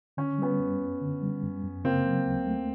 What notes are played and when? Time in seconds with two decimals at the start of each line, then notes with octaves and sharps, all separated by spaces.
0.17 D3 C#4
0.38 G3 B3 C#4
0.59 F#2
0.80 F#2
1.01 D3
1.22 G3
1.42 F#2
1.64 F#2
1.84 C#3 A#3 C4
2.05 F#3
2.26 D2
2.47 A3